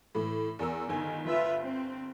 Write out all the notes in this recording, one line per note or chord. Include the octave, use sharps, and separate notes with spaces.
A2 E3
E2 A#4 E6
G1 D#3 G#5
F4 B4 E5
C4